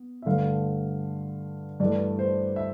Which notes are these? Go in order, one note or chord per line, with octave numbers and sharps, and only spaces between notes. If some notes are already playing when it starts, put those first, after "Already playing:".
Already playing: B3
E5
G2 D3 A3 F5
G2 E3 A3 D5
C5
E5